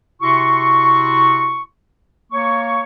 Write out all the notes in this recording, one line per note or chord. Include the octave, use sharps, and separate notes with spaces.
C3 E4 F#4 C6 C#6
A#3 C#5 C#6